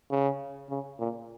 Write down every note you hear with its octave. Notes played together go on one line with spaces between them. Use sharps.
C#3
C#3
A#2